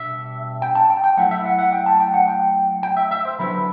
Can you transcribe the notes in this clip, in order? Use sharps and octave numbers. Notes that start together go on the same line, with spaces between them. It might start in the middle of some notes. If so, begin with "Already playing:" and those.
Already playing: B2 G3 D4 E5
G5
A5
G5
G5
F#3 A3 E4 F#5
E5
F#5
F#5
G5
A5
G5
F#5
G5
G5
E5
E5
C5
D3 F#3 B3 E4 B4